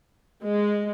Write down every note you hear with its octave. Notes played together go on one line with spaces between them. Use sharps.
G#3